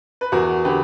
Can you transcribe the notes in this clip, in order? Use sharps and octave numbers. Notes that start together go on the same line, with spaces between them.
B4
E2 F#4 A#4
D3 G4 B4